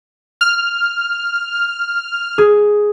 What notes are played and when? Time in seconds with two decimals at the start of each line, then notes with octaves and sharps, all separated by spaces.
0.41 F6
2.38 G#4